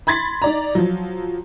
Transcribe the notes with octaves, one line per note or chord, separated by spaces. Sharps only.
B5 C6 G#6 A6 B6
D#4 D5 A#5
F3 F#3